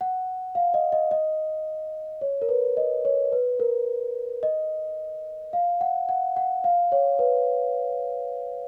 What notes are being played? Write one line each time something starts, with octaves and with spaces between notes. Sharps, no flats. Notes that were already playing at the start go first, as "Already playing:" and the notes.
F#5
F5
D#5
D#5
D#5
C#5
A#4
B4
D#5
C#5
B4
A#4
D#5
F5
F#5
F#5
F#5
F5
C#5
B4